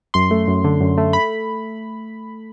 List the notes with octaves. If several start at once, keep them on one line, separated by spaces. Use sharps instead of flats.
F#2 C6
A3
F#2
D3
F#2
A3
B5